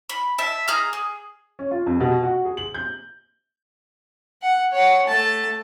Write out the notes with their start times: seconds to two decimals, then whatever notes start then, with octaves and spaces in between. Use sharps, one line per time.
0.09 B5
0.38 E5 A5
0.68 G#4 A#5 F6
0.93 G#4
1.59 C#4
1.71 F4
1.86 F2
2.00 B2
2.23 F#4
2.45 G#4
2.57 F#7
2.74 G6
4.42 F#5
4.72 C#5 F#5
5.07 A3 A5